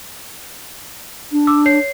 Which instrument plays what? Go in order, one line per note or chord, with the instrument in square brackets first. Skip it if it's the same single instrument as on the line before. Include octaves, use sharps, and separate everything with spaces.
[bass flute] D4
[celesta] D6 E6
C#5 C7